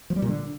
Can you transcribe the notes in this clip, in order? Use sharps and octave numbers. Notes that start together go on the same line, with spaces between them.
F3
G3
A#2
D3